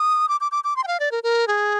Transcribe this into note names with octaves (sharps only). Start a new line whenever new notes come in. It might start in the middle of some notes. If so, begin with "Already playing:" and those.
Already playing: D#6
D6
D6
D6
D6
C6
G5
F5
D5
A#4
A#4
G#4